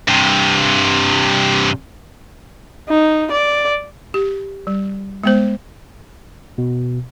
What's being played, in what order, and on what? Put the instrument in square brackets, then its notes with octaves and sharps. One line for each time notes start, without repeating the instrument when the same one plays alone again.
[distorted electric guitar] G2 C3
[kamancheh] D#4
D5
[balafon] G4
G3
G#3 B3 C5
[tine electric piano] B2